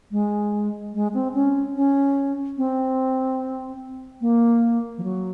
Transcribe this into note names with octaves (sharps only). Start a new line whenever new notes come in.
G#3
G#3
C4
C#4
C#4
C4
A#3
F3
F#3